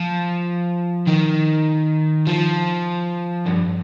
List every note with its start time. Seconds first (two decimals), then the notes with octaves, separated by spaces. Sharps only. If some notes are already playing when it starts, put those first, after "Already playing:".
Already playing: F3
1.08 D#3
2.27 F3
3.46 G2